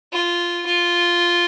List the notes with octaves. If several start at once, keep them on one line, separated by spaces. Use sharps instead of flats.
F4
F4